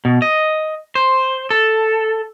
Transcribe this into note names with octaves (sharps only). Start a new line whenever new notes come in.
B2
D#5
C5
A4